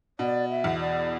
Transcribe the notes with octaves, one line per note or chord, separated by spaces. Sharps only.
B2 D5
E5
E2
D5